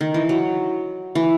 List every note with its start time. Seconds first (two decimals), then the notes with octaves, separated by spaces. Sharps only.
0.01 D#3
0.14 E3
0.29 F#3
1.15 E3